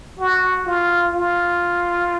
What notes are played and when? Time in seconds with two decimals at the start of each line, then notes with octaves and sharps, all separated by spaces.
0.19 F#4
0.66 F4
1.14 F4